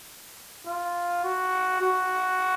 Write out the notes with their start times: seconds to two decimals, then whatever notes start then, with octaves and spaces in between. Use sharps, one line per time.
0.66 F4
1.23 F#4
1.81 F#4